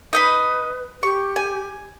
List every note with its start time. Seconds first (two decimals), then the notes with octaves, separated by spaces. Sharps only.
0.13 D#4 B4 D#5 B5
1.03 G4 C#6
1.36 G#5